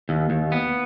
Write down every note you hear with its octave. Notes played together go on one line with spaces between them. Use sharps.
D#2
D#2
B3